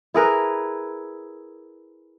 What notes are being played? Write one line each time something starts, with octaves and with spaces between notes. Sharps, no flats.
E4 G#4 A#4 B4